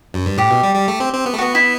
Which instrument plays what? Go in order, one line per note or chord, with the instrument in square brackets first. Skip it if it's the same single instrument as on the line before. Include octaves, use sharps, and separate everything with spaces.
[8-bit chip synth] F#2
G2
[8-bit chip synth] A2 [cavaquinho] G4
[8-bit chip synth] B2
G3
G3
A3
C4
C4
B3
A3
[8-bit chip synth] B3 [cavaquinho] F#4
[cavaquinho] E4